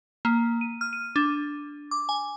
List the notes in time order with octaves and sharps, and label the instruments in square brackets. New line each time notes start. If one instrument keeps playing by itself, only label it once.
[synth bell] A#3
D#7
F6
D#7
D4
D6
G#5